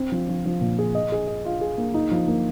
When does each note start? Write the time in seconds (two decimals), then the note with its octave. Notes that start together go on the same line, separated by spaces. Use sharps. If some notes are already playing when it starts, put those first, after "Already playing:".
Already playing: C4
0.12 F3
0.29 F3
0.45 F3
0.61 A#2
0.79 G#4
0.95 D#5
1.12 G#4
1.27 D#5
1.45 F4
1.61 G#4
1.78 A#3
1.94 D#4
2.11 F3
2.28 A#3